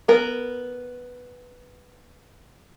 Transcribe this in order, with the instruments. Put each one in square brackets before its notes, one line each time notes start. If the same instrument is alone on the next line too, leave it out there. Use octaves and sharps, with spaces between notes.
[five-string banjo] B3 A#4